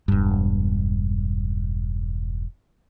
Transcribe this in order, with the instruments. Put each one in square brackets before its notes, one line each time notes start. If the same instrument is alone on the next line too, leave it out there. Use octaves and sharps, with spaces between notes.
[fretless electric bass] E1 G2